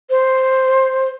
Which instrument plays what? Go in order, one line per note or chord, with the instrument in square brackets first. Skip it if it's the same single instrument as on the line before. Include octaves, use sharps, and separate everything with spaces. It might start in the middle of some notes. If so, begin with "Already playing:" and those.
[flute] C5